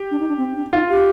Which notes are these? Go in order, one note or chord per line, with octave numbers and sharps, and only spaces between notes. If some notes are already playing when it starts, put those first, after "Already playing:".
Already playing: G4
D4
D#4
D4
C4
D4
D#4 F4
G4